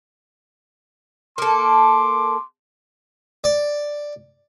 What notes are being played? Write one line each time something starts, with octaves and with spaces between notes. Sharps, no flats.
A#3 A4 C6 D6
D5